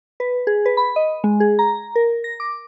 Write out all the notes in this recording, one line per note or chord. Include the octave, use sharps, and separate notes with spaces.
B4
G#4
B4
B5
D#5
G#3
G#4
A#5
A#4
A#6
D6